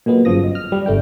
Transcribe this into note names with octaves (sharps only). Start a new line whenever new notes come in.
A#2 F#3 G#3 B3
G1 F#2 F3 D#6 A#6
D#5
F6
G3
G1 A3 D4 G5